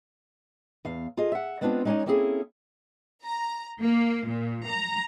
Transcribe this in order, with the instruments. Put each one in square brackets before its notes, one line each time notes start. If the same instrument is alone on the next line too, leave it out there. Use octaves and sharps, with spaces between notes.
[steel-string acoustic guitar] E2 F5
F4 G#4 A4 D#5
E5 F#5
G#3 B3 C4 D4 D#4 F4
G#3 C#4 D#4 C#5 D5 G#5
A#3 C4 C#4 E4 G#4 A4
[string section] A#5
A#3
A#2
A#5